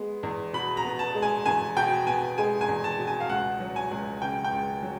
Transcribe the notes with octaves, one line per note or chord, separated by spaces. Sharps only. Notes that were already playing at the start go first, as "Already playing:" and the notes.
Already playing: G#3 B3
E2
B2 B5
A#5
B3
A5
G#3
G#5
E2 G#5
B2 G5
B3 G#5
G#3 G#5
G#5
E2
A5
B2
G#5
F5
C#2 F#5
F#3
G#5
C#2
C#3 G5
G5
C#2
F#3